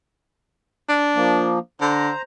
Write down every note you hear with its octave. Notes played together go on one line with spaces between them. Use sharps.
D4
F3 A#3
D3 C5 A#5